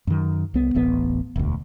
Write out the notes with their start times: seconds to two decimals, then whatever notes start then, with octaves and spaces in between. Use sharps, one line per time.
0.07 F#2 D#3
0.54 C2 B3
0.75 D1 A1 B3
1.36 E1 D2